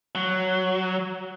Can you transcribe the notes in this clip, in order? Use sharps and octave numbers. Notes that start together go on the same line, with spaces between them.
F#3